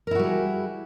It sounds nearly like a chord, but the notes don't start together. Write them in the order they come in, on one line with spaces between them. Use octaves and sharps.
A#4 E4 F#4 G3 G#4